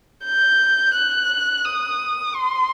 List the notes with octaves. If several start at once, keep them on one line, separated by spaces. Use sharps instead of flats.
G6
F#6
D#6
C6